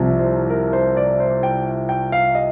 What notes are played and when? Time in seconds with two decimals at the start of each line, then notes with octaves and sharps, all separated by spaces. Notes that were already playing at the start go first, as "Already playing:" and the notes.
Already playing: C2 C3 F3
0.19 C5
0.50 A#4
0.73 C5
0.97 D5
1.20 C5
1.43 G5
1.89 G5
2.12 F5
2.35 D#5